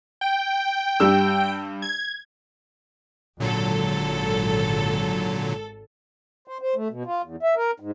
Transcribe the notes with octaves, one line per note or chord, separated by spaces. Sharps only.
G5
G2 G4 E6
G#6
G#1 A#2 D3 F#3 A4
C5
C5
A3
B2
F4
E2
E5
A#4
G#2